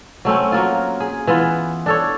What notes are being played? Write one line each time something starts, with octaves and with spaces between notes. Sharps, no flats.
F#3 A3 C4 C#4
F#3 A#3 F4
G#4
E3 B3 F4
D4 A4 C#5